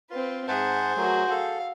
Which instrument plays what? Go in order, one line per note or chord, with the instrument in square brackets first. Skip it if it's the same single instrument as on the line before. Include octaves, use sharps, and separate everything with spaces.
[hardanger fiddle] C4 B4 [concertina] F4
[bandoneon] G#2 F#5 A5 [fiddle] G#4 [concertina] C5 [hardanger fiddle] E5
[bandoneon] F#3 A3 [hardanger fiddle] F#4 A#4
[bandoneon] A4 [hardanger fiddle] F5